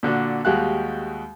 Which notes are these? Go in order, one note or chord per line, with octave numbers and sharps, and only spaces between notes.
A#2 D3 D4 F#4
D#2 G3 G#3 F#4 F5 F#6